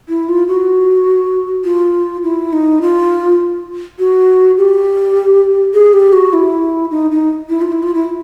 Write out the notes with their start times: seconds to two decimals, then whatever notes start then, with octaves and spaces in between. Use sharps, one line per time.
0.09 E4
0.29 F4
0.48 F#4
1.65 F4
2.23 E4
2.53 D#4
2.82 F4
3.99 F#4
4.57 G4
5.74 G#4
5.93 G4
6.13 F#4
6.33 E4
6.91 D#4
7.11 D#4
7.49 E4
7.61 F4
7.72 E4
7.83 F4
7.95 E4